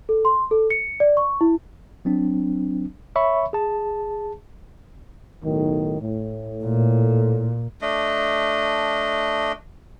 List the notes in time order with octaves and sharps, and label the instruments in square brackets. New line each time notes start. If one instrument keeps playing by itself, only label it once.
[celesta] A4
C6
A4
C#7
D5
C#6
E4
[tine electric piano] F#3 C4 D4
C#5 E5 B5 C#6
G#4 A5
[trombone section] B1 A2 D#3
A2
[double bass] A#2
[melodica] A3 D4 D#5